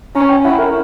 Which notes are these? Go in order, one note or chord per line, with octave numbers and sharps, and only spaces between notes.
C#4 A#5
G5
E4 F#5
A#4